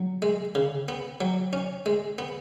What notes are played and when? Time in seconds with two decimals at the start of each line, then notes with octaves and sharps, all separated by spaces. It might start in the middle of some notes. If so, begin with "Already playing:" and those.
Already playing: F#3
0.22 G#3
0.55 C#3
0.88 B3
1.21 F#3
1.53 C#4
1.86 G#3
2.18 B3